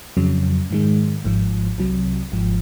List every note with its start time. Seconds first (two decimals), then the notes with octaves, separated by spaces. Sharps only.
0.17 F2 C#3 F#3
0.71 G#2 D#3 G#3
1.25 G#1 G#2 F3
1.78 C2 C3 F#3
2.32 G#1 G#2 F3